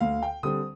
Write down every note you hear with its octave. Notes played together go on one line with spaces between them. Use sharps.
D2 F5
G5
D3 G3 C4 D#6